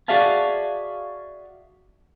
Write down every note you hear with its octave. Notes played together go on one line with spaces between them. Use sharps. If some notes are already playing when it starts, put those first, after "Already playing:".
F#4 G#4 D5 E5 F5 A5